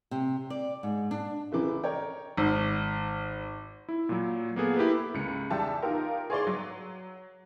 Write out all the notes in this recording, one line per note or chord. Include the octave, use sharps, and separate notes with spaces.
C3
D5
G#2
D4
A1 C#3 E3 D6
A#4 C#5 D5 G5
G#1
E4
A#2 F#3
A#3 B3 G#4 A4
E4 G4 A#4 B4
C#2 C#7
E2 G4 E5 A5
D#4 F4 G4 A#4
G#4 C#5 D5 C6
F#3